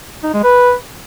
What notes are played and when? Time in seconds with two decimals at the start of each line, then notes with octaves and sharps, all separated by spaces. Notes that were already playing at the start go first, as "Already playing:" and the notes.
0.23 D#4
0.34 G#3
0.44 B4